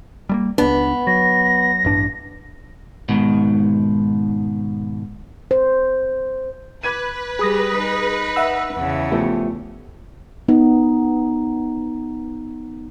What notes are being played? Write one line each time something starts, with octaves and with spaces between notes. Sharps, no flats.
G3 A3 A#3
C#2 B3 D4
F#3 A#6
A1 G2 D4
G#2 B2 D#3
C5
B4 D6 G#6 D#7
G3 G4 G#4 D#6 A#6
D#4
E5 F#5 E6
E2 C#3
F3 A3 B3 G4
B3 D#4